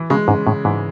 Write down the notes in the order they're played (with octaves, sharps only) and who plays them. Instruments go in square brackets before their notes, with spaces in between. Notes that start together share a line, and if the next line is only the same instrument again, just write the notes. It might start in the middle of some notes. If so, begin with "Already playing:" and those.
Already playing: [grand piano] E3
[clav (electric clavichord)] C#3 [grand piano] G#3
[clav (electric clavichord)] G#2 [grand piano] C#3
[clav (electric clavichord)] A2 [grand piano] C#3
[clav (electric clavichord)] G#2 [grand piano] E3